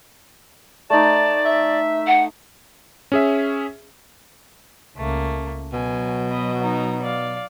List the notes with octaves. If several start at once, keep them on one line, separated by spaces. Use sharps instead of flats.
A3 D#4 D5 A5
E5
F#5
C#4 G#4 E5
C#2 A3 A#3
B2 F#3 G#5
B3 D#5
D#4 A#5
D5 F5